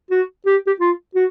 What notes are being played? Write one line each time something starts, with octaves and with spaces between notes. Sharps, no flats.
F#4
G4
G4
F4
F#4